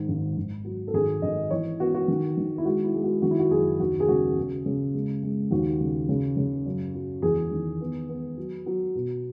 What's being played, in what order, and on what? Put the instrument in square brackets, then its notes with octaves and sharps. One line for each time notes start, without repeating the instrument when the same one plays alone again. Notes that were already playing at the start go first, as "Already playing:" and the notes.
Already playing: [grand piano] G#2 D#3
G#1
G#1
F#3
A4
G#1 G#4
G#1 D#5
E3 C#5
B3 F#4
F#4
D#3
D#3
E4
G#3 F#4
E4
G#3
F#4
D#3 F#4
E4
F#4
F#1 G#4
D#2 F#4
G#4
C#3 F#4
C#3
C#3
G#3
G#3
D#2 F#4
C#3
C#3
C#3
F#2
F#3
E2 G#4
D#3
B3
B3
F#3
F#3
B2